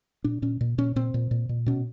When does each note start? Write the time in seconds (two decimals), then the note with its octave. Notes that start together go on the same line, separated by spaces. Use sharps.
0.24 A#2 D4
0.42 A#2 C#4
0.61 A#2
0.78 A#2 C#4
0.96 A#2 C4
1.14 A#2
1.31 A#2
1.49 A#2
1.66 B2 C#4